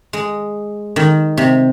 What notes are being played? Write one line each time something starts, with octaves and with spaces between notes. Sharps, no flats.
G#3
D#3
C3